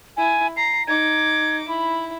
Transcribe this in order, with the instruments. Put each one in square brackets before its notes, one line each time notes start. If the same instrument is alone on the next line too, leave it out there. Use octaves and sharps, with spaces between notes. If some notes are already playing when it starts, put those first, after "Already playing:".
[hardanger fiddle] E4 [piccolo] G#5
[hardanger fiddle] A#5 [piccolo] C7
[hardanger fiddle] D#4 D6 [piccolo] G#6
[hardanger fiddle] E4 [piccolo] B5